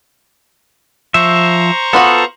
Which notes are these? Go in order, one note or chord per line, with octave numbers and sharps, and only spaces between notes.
F3 C5 E5 A#5 C#6
B3 F4 F#4 A4